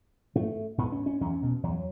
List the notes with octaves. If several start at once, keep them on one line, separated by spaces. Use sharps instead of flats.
G#2 A3
G#2 B3
C#4
C#4
E2 C#4
B2
E2 F#3